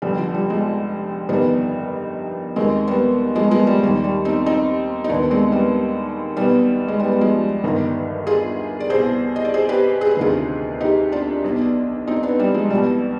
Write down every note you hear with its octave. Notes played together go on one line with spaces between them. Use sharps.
F1 F2 D3 G3
F3
G3
F3 G#3
G1 F2 D#3 G3 B3
D#2 D#3 G#3 C4
G3 B3
F3 G#3
B3
F3 G#3
G3
D#2 D#3 G3
G3
C4 D#4
C4 D#4
D#4
D#2 D#3 B3 D4
G#3 C4
G3 B3
B1 B2 G3 B3
G#3
G3 B3
G3
F3 G#3
G1 G2 D#3
F4 G#4
D5
C2 B2 G#4 C5
D#5
D5
G#4 C5
G4 B4
G#4
B4
D2 C3 D#3 F4 G#4
D#4 G4
D4 F4
B1 B2
C4 D#4
B3 D4
G3
F3 G#3
C2 B2 G3